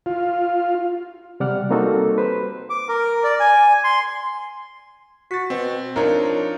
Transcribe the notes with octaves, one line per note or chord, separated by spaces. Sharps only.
F4
C3 G3 D5 F#5 F6
G3 A#3 C4 D#4 F#4 A4
B4 C5
D6
A#4
D5
G#5
C6
F#4 A6 B6
B2 C4
F3 D4 D#4 A#4 C#5